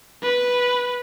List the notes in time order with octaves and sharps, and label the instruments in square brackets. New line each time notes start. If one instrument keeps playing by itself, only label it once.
[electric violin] B4